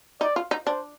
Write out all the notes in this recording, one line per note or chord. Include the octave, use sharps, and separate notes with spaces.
D#4 D5
F4
D#4
D4 C5